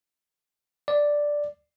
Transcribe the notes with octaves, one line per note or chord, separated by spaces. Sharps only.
D5